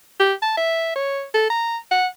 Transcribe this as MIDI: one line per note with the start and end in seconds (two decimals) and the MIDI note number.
0.20 0.33 67
0.42 0.57 81
0.57 0.92 76
0.96 1.24 73
1.34 1.49 69
1.50 1.78 82
1.91 2.07 78